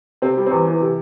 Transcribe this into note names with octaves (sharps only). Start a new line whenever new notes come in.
C3 C4
G3
E2 C4
E3
C3